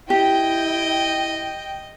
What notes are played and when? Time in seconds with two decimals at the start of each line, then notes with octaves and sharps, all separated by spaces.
0.10 E4 G4 D#5 G5